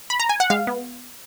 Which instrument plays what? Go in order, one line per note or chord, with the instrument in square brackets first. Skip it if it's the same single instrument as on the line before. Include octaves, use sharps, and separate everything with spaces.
[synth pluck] B5
A#5
G#5
F#5
G#3 F5
B3